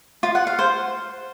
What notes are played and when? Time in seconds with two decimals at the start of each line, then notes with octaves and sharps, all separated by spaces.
0.23 F4
0.35 F#5
0.47 F5
0.59 C5